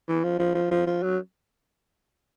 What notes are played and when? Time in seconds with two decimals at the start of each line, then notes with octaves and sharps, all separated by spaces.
0.09 E3
0.24 F3
0.39 F3
0.55 F3
0.71 F3
0.87 F3
1.03 F#3